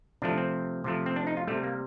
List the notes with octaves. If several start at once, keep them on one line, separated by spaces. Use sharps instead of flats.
C3 F3 A3 D4
C4
C3 F3 A3
C4
D4
D#4
F4
C3 G3 A3
A#3